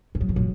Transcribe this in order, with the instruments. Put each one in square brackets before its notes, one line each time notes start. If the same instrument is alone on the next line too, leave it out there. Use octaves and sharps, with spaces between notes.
[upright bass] G#2
[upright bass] F#2 [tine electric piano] F#3
[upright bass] G#2 [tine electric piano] E3
[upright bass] A#2 [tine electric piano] F#3